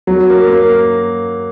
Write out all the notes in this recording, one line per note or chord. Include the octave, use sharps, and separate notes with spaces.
F#3
A#3
A#3